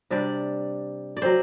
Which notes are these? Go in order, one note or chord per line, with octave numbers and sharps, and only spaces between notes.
C3 G3 D4 D5
D5
F#3 A3 C4 C5